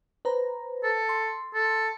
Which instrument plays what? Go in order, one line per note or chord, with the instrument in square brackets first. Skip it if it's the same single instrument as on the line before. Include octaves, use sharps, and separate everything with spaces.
[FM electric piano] B4 C5 A#5
[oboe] A4
[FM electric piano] C6
[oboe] A4